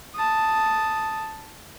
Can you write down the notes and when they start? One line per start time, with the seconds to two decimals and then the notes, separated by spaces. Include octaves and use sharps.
0.15 A5 D#6